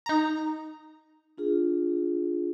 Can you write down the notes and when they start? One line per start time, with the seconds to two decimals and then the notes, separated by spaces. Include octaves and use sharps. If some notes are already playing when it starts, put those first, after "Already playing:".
0.06 D#4 A#5
1.38 D4 F4 G#4